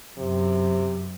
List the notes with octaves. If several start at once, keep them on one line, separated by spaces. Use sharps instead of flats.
F#2 C3